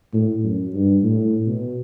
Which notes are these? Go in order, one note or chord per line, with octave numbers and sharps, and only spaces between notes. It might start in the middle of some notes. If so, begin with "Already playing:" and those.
A2
F#2
G2
A2
B2